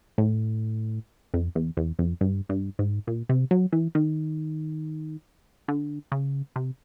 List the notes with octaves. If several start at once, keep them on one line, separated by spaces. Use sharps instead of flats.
A2
F2
E2
E2
F2
G2
G2
G#2
A#2
C3
F#3
E3
D#3
D3
C#3
C3